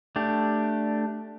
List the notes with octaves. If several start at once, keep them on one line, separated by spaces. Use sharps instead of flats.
A3 D4 G4